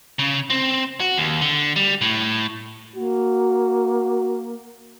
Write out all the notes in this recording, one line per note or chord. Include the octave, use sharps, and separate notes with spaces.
C#3
C4
F#4
D#2
D3
G3
A2
A#3 F#4